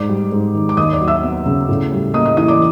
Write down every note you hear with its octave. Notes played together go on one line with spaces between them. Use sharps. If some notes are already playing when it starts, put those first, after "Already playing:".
Already playing: G#2 D5 D6
G3
G#2
D#3
D6
D#2 D#5 D#6
D5 D6
F#3
E5 E6
B3
C#3
A2
G3
A#3 D#5 D#6
D#5 D#6
E3 D#5 D#6
D5 D6